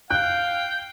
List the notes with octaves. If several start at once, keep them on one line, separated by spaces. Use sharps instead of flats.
F5 G5 F#6